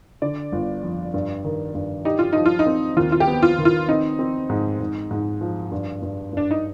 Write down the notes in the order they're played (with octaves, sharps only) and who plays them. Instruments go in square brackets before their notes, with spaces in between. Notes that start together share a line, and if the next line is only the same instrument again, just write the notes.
[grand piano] D3 [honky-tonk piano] D5
[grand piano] G1
F2
G2
D#3
G2
[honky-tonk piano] D#4 [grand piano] G4
[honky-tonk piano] F4
[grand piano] F3 [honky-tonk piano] D#4
[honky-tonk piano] F4
D#4
[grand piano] C4
[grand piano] D#2 [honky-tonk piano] F4
[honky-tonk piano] F4
G4
[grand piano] B3
[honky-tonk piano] F4
[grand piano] D#3
[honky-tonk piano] F4
[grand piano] C4 [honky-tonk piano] D#4
[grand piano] C4
G#2
G#2
G#2
F3
G2
G2
[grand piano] G2 [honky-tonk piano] D4
[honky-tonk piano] D#4